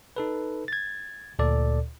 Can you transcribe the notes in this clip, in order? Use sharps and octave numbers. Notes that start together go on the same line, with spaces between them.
D#4 A4 B4
G#6 A6
D2 A#2 A4 D5